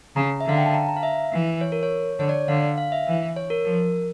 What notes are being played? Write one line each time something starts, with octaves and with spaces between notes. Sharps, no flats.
C#3 A#5
E5
D3 F5
G5
A5
A#5
A#5
F5
E5
E3
C#5
A#4
C#5
D3 C#5
D5
D3 F5
F5
E5
E3
C#5
A#4
F3 A#4